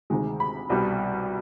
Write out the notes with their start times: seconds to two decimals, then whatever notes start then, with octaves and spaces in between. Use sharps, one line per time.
0.10 D2 C3 D#3 G#3
0.40 B5
0.70 C2 B2 G3